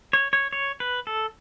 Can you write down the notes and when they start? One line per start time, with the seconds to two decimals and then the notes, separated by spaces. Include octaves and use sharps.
0.13 C#5
0.33 C#5
0.53 C#5
0.80 B4
1.07 A4